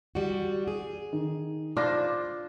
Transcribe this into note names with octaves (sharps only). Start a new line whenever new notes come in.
G3 F#4
G#4
D#3
D4 F4 C5 D6 A#6